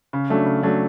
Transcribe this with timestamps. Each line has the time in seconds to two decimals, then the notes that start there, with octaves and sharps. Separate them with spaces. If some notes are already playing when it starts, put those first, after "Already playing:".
0.13 C#3
0.30 F#3 A3 D4
0.46 C#3
0.63 F#3 A3 D4